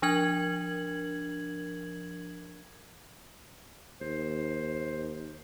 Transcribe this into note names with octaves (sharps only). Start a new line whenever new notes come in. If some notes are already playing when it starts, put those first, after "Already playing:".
F3 D4 A#4 G#6 F#7
D#2 C5